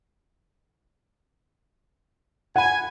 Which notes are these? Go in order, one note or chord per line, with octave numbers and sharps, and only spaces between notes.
F#5 G#5 B5